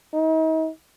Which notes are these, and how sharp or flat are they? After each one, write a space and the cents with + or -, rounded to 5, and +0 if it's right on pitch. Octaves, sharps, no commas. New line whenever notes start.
D#4 +40